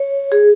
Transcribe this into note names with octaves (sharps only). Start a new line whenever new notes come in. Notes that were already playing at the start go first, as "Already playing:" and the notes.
Already playing: C#5
G#4